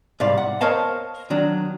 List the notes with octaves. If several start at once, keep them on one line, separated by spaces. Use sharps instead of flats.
C2 G#2 D5 F5
F#5
A#4 C5 C#5 D#5 F5 A5
D#3 F#3 D4